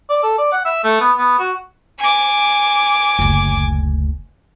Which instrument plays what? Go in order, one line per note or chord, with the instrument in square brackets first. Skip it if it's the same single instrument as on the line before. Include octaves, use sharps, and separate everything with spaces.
[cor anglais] D5
A4
D5
F#5
E5
A3
B3
B3
F#4
[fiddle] G#5 D6
[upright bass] F#1 D2